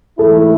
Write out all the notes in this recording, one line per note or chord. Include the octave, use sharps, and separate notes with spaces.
G#2 E3 A3 E4 A4